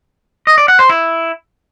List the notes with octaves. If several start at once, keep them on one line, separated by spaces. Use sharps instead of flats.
D#5
D5
F#5
C5
E4